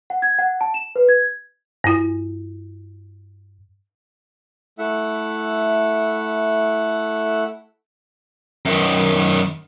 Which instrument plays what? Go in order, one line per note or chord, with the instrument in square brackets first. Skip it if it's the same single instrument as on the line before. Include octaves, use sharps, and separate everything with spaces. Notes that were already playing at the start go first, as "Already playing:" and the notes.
[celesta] F#5
G#6
F#5
A5
E7
B4
G#6
[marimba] G2 E4
[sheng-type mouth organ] A3 E4 E5 F#5
[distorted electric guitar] F#2 D#3